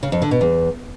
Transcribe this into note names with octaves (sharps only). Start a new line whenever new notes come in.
C#3
F2
D3
B2
E2